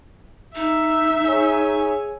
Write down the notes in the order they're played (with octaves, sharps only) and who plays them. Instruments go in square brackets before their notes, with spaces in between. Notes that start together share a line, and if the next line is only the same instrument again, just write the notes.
[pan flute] D#4 [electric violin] E5
[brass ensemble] G#4 C#5 G#5